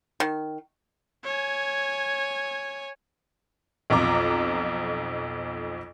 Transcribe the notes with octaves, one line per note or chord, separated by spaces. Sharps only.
D#3
C#5 G#5
B1 F2 F4 A#5 D6